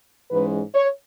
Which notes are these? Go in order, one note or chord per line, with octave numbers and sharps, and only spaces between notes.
G#2 E3 G#3 C#4 B4
C#5